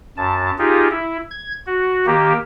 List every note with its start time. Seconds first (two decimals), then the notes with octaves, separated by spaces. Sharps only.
0.17 F#2 A5
0.58 D#4 F4 G4 G#4
0.91 E4
1.31 G#6
1.66 F#4
2.06 D#3 A#3 G4